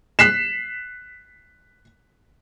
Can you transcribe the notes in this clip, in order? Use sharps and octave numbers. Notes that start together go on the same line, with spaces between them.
F#6 B6 C7 E7